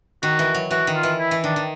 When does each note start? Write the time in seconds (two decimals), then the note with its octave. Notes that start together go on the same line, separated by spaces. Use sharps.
0.23 D#3 F#4
0.39 E3
0.55 F#3
0.71 E3 F#4
0.87 D#3
0.96 F4
1.03 E3
1.19 E4
1.31 E3
1.44 D#3 D4
1.56 D#3